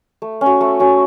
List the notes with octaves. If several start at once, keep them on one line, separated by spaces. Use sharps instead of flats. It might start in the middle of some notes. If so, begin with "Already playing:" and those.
A3
C#4 F#4
A3
C#4 F#4